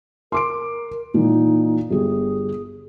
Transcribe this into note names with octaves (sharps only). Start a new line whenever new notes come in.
A#4 C6 D6 D7
A#2 E3 D#4
G1 G4 G#4